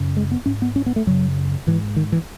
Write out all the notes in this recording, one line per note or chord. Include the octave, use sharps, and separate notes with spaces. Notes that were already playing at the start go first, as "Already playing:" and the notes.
Already playing: F#2 C#3
G#3
B3
G#2 C#4
B3
C#4
B3
A3
F#2 C#3 F#3
G#2 E3
D#3
E3